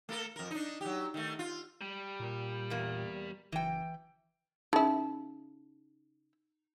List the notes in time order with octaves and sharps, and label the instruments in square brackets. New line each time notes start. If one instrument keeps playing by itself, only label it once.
[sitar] A3 A4 A#4
F2 A#4
D4 D#4
F#3 G4
D#3 A3
F4
[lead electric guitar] G3
[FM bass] A#2
[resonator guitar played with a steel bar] E2 A#3
[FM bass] F#1 [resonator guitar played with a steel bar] E3 G5
[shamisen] C#3 E4 [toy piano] D#4